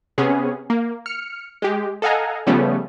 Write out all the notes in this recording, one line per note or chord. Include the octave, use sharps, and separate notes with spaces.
C3 B3 C#4 G#4
A#3
F6 C#7
G#3 G4
A4 D#5 F5 F#5 G#5 A#5
C#3 F3 G3 A3 B3 C#4